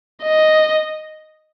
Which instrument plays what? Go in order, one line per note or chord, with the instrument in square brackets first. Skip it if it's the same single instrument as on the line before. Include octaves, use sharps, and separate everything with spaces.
[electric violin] D#5